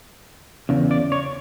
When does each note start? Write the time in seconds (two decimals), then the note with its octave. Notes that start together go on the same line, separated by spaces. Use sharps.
0.69 E2 C#3
0.91 D5
1.12 C#5